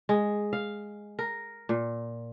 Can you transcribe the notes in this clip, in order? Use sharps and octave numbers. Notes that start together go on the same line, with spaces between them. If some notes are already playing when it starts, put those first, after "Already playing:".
G#3
F5
A#4
A#2